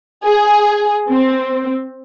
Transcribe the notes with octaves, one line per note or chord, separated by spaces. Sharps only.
G#4
C4